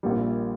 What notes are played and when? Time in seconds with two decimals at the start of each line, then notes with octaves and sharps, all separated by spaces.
0.03 A#1 A#2 G3